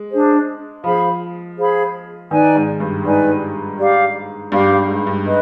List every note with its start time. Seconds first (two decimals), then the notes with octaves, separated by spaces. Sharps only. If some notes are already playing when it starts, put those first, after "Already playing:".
Already playing: G#3
0.11 D4 G#4 C5
0.84 F3 G#4 C5 F5 B5
1.57 G#4 C5 F5 B5
2.31 D#3 D#4 B4 D5 G#5
2.55 G#2
2.80 G2
3.04 G#2 D#4 B4 D5 G#5
3.78 G4 D5 F5
4.52 G2 G4 D5 F5
4.70 G2
4.88 G#2
5.07 G2
5.25 B4 D#5